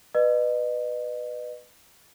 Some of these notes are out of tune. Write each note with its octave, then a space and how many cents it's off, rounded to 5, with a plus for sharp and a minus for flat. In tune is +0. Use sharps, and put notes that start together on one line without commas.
B4 +0 D#5 -35